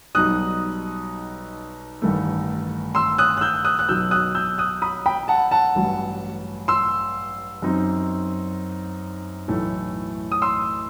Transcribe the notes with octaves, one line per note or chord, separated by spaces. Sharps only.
B1 B2 G3 D#4 D#6 F#6
A1 G2 D#3 A3
C6 E6
D#6 F#6
F#6
E6 G6
D#6 F#6
F#6
B1 B2 F#3 E6 G6
D#6 F#6
E6 G6
D#6 F#6
B5 D#6
G5 B5
F#5 A5
F#5 A5
A1 G2 F#3
C6 E6
F#2 F#3 C4 D#4
B1 A2 E3 A3
D#6
C6 E6